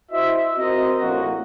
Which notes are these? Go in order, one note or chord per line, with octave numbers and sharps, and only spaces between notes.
E4 F#4 C5 D#5 E5
C4 F#4 A#4 C5 D#5
A#1 A2 A#3 C#4 F#4